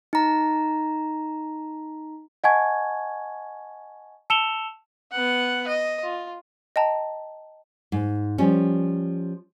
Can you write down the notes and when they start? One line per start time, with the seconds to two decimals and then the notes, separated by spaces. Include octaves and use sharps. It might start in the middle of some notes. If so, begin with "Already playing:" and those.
0.13 D#4 A#5
2.44 D#5 F#5 G#5 A5 C#6 G#6
4.30 A5 E6 C#7 E7 F7 G7
5.12 B3 F#5
5.68 D#5
6.03 F4
6.76 D#5 G5 A5 A#5
7.92 G#2
8.38 F3 G3 C#4